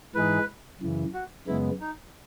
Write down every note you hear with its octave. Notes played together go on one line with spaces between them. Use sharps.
G#2 E3 G#3 D#4 G#4 B4
F#2 C#3 E3
F#4
F#2 C#3 G#3 B3 E4
D#4